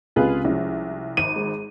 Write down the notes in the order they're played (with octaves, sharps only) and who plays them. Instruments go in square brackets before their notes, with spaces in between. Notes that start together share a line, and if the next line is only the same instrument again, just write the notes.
[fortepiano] C#2 C3 [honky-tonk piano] F4 G#4 B4
[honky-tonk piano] C2 [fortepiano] F3 G#3 C#4
[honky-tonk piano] G#1 D#7
[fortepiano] G#3